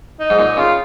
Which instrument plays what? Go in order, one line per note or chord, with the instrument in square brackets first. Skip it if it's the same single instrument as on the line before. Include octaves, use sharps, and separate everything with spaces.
[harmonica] D#4
[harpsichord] G#2
[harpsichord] A#2 [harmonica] D#4
[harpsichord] C#3 [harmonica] F4